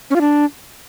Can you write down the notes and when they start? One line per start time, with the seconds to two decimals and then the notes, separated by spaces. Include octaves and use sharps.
0.10 C#4
0.16 F4
0.21 D4